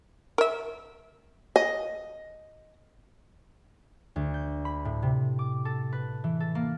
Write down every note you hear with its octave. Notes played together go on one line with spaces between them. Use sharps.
A#4 E5
D#5
D2
G6
B5
A2
C3
D6
A4
B4
E3
A4
A#3